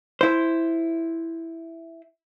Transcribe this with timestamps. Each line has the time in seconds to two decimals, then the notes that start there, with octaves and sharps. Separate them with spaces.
0.21 E4 C5